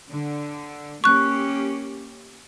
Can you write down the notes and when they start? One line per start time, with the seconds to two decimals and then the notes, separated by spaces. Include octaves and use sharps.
0.11 D3
1.04 A#3 C#4 G4 C#6 F#6